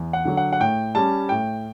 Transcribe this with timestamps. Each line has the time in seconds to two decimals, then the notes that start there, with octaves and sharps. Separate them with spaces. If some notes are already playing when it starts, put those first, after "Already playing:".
Already playing: E2
0.13 F#5
0.25 D3 F#3
0.37 F#5
0.53 F#5
0.60 A2 G5
0.95 G3 C#4 A5
1.29 A2 G5